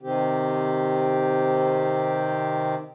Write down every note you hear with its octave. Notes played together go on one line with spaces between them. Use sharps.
C3 D#3 C4 G4